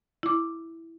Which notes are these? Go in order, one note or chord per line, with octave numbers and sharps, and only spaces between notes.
E4 D6